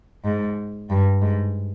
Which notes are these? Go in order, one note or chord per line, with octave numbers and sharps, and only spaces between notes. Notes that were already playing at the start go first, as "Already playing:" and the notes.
G#2
G2
G#2